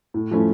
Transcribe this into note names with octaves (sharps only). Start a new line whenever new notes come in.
A2
F3 A3 C#4 E4